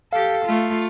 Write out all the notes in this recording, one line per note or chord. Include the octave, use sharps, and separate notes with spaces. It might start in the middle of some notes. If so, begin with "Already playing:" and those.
G4 A4 F5
A3 F4